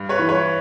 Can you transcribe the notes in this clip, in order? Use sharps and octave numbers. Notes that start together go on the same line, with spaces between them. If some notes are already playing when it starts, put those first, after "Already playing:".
Already playing: G2
B4 C#5
E3
B4 C#5